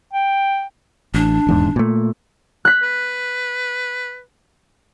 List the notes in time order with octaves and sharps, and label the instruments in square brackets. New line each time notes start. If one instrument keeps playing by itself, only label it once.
[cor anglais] G5
[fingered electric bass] A1 [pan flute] D4
[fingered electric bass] D#1 E2 G#2
A#2 A3
[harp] F#6 B6
[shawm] B4